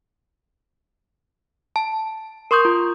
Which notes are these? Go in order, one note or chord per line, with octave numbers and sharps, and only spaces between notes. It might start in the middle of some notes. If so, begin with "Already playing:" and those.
A5
A#4 C6 C#6 D#6 G6
F4